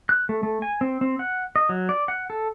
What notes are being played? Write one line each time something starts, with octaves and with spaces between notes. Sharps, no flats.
F#6
A3
A3
G#5
C4
C4
F#5
D#5
F#3
D5
F#5
A4